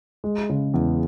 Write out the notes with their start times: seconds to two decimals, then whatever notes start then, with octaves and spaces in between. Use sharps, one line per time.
0.24 G#3
0.50 C#3
0.74 E2